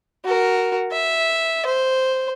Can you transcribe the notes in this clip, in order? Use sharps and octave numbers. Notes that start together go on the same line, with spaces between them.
F#4 A#4
E5
C5